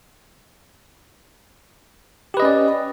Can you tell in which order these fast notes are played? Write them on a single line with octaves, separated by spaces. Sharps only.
G4 B4 D#5 C#4 D5